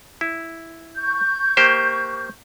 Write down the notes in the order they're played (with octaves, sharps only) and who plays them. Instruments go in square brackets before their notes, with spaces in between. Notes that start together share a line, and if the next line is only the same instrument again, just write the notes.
[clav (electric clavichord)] E4
[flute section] C#6 G6
[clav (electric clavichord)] A#3 G4 C5